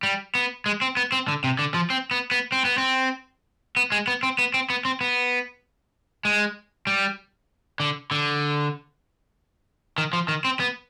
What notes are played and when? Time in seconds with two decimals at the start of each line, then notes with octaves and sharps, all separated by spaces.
0.03 G3
0.35 B3
0.66 G#3
0.81 C4
0.97 B3
1.12 C4
1.28 D3
1.44 C3
1.59 D3
1.74 F3
1.90 C4
2.11 B3
2.31 B3
2.52 C4
2.65 B3
2.78 C4
3.77 B3
3.92 G#3
4.07 B3
4.23 C4
4.39 B3
4.54 C4
4.70 B3
4.85 C4
5.01 B3
6.25 G#3
6.87 G3
7.80 D3
8.11 D3
9.98 D#3
10.13 F3
10.28 D#3
10.45 C4
10.60 B3